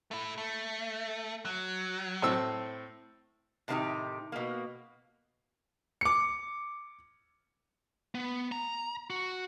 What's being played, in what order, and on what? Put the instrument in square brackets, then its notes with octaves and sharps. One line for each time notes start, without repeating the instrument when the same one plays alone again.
[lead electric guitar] A3 E4
A3
F#3
[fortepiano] A2 C4 E6
[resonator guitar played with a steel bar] A2 C3 D#3 B3 D#4 G4
B2 A#3
[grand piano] D6 C#7
[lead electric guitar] B3
A#5
F#4